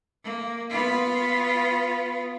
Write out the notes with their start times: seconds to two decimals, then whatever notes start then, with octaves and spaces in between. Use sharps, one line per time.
0.23 A#3
0.70 B3 F4